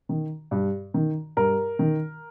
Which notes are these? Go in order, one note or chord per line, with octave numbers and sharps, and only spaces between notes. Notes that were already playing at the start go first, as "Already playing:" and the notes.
D#3
G2
D#3
G2 A#4
D#3